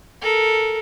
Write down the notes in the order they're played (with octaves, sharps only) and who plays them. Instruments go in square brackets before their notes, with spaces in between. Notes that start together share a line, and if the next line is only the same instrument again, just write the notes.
[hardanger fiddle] A4 A#4